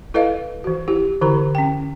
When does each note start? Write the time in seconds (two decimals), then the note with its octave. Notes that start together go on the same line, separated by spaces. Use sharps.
0.14 E4 A4 B4 D#5 F5
0.64 E3 F#4
0.88 E4 G4
1.21 D3 E3 E4 G4 A#4 A#5
1.55 C#4 G5